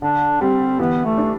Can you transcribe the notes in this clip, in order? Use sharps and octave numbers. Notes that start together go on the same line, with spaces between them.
D3 D4
G3 C4
E3 B3
A3
D4